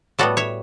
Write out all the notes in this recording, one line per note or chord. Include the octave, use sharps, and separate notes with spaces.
A2 G3 B3 F#4 A4
C#5 E5